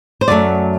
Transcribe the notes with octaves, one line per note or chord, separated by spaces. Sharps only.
C5
F#2 F#3 A3 D5